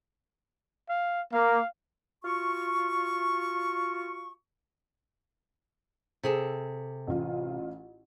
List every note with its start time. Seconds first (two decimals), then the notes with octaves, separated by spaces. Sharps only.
0.89 F5
1.33 A#3 F5
2.24 F4 F#4 C#6
6.23 C3 G#4 A4
7.07 A1 F4